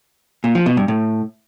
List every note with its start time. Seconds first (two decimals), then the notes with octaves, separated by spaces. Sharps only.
0.44 A#2
0.55 F3
0.66 B2
0.77 G2
0.88 A2